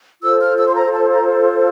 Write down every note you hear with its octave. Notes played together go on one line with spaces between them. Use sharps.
F4 A4 C5 E6
F6
E6
C6
A#5
A5
A#5